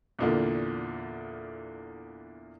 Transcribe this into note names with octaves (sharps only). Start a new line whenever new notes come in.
E2 A#2 D3